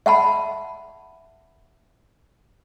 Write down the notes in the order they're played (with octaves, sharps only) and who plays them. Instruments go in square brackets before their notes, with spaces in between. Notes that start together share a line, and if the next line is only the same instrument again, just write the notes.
[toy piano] E5 F#5 A5 B5